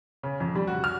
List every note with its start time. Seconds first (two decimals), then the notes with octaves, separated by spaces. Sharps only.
0.23 C#3
0.40 F2
0.55 G3
0.67 F#4
0.84 F6